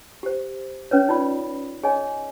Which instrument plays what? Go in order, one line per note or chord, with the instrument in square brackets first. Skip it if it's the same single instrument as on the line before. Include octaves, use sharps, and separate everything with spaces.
[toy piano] G4 C5
C#4 B4 C#5
D#4 F4 D5 B5
G#4 C#5 D#5 G#5